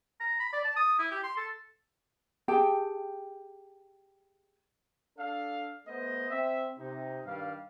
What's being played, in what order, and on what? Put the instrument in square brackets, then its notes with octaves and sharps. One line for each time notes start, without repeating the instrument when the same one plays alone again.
[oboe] A#5
B5
D5
A5
D#6
E4
G4
C6
A4
[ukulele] G4 G#4 G5 A5
[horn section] D4 A4 F5
A3 B3 C5 D#5
C4 E5
C3 D#4
G2 D#3 G3 F5